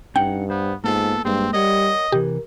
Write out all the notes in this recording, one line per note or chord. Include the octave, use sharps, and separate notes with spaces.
G2 C#4 D#4 F#5 G5
B3 C5
G#2 A#3 B3 F4 A4
G2 G#3 A#3 C4 G#4
G3 A#4 C#5 D#5 F#5
C3 E3 G4 A#4